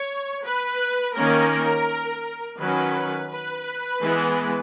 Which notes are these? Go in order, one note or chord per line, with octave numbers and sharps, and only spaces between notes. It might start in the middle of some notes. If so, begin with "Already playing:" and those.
Already playing: C#5
B4
D#3 A#3 C#4 A#4
D#3 F#3 C#4 B4
B4
E3 G#3 B3